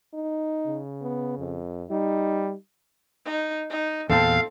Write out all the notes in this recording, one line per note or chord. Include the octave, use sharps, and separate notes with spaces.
D#4
C#3
B3
F2
G3 D#4
D#4
D#4
E2 A#2 C4 A4 F5 A5